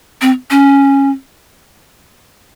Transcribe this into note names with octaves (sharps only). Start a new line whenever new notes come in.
C4
C#4